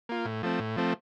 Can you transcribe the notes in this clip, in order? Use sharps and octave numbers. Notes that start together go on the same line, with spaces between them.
A#3 F4
A2
F3 A3 C4
A2
F3 A3 C4